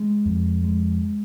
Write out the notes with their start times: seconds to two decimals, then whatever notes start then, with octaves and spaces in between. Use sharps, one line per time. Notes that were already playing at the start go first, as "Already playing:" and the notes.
Already playing: G#3
0.25 F2
0.64 G#3